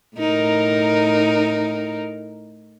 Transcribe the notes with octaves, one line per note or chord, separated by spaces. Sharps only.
A2 D#4 A#4